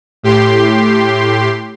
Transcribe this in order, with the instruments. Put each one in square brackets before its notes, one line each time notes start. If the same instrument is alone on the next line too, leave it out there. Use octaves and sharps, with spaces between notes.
[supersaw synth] A2 G4 C6